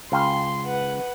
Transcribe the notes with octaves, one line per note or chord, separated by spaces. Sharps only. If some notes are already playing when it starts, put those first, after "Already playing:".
C#2 F5 G5 C6
B4 F#5